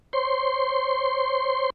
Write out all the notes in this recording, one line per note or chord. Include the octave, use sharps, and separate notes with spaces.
C5 C#5 C6